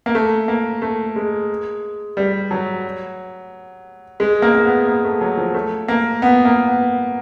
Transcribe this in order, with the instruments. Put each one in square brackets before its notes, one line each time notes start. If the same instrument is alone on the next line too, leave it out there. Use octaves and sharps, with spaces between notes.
[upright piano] A#3
A3
A#3
A3
G#3
G3
F#3
G#3
A#3
A#3
B3
A#3
A3
F#3
F3
A3
A#3
B3
A#3
B3